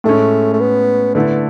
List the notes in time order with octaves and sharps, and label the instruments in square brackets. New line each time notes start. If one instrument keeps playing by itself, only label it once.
[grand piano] A2 G#3 C#4 [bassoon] A3
[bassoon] A3
B3
[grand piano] D3 A3 E4 [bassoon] B3